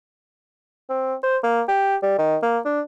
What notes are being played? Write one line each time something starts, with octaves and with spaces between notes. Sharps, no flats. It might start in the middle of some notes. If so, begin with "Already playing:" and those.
C4
C5
A#3
G4
G3
D#3
A#3
D4